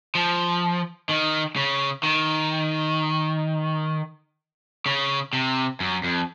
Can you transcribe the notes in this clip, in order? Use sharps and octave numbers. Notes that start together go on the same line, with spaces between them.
F3
D#3
C#3
D#3
C#3
C3
F#2
F2